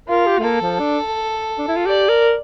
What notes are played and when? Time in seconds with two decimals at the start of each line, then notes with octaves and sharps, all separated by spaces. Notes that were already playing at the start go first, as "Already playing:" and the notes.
0.08 F4 A#4
0.27 G4
0.39 A3
0.44 A#3 A4
0.62 F3
0.80 D4
1.58 D4
1.68 E4
1.76 F4
1.86 G4 D5
2.09 A#4